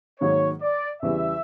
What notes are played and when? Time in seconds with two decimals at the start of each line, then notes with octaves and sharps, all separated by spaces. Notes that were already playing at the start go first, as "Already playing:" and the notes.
0.20 G#2 D#3 F#3 A#3 C#5
0.62 D5
1.02 E2 C#3 E3 G3 E5